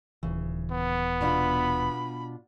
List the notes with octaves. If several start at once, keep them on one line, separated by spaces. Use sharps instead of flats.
D#1 A#1 C#3 E3
B3
B2 D4 F4 B5